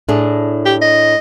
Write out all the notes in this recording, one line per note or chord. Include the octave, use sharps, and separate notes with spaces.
A2 D4 G#4
G4
D#5